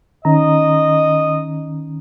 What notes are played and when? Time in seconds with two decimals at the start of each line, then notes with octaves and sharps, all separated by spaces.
0.25 D#3 C#4 D#5 A#5